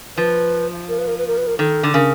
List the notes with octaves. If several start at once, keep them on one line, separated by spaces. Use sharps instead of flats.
F3 B4
A#4
B4
A#4
B4
A#4
B4
A#4
D#3 A4
D3
A4
C#3 A#4